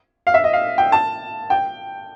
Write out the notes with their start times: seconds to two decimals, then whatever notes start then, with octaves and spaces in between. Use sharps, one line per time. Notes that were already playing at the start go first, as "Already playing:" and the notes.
0.27 F5
0.34 E5
0.44 D#5
0.53 F5
0.78 G5
0.92 A5
1.50 G5